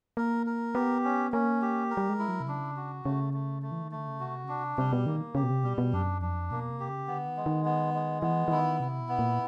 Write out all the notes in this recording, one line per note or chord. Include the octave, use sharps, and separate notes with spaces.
A#3 A#4
A#4
B3 G4
C#4
A#3 C#4
G4
A#4
G3
G#3
E4
F#3
C3
C#3 D4
F#4
C#3 A3
A3
A3
E3
D#3
D3 A3
C#3
C3 F#4
C#3
C3 D4
C3 G3
B2
D#3 A#3
C#3 G4
B2
C3
B2 G3
B2
F#2 D4
F2 D4
B2 A#3
C3
G4
C#3
D3 B3
D#3
E3 G#3
D#3
B3
G#3
E3 B3
E3
D#3 E4
C3 E4
B2
B3
A#2